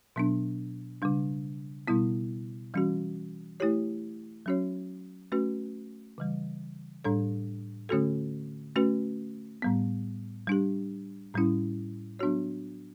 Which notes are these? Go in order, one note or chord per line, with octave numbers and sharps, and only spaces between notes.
B2 F#3 B3 D4
C#3 G3 D4
B2 G3 B3 E4
E3 G3 C#4 F#4
A3 E4 G4 C#5
F#3 C#4 F#4 C#5
A3 C#4 F#4 B4
C#3 E3 G3
A2 G3 D4 A4 C#5
D3 A3 C#4 F#4 A4
A3 C#4 F#4 B4
A2 G3 B3
G3 D4 G4
A2 G3 C#4 E4
F#3 B3 D4 F#4 C#5